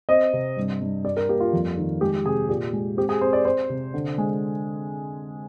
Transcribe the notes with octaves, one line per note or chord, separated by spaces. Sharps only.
C4 D#5
C3
G2
G2
G3 D5
A#4
A#3 G4
F4
F2
D#3
G#3 G4
C3 G#4
A#2 G4
G#3
C4 G4
G#4
C4 C5
D5
C4 C5
C3
D3
G#3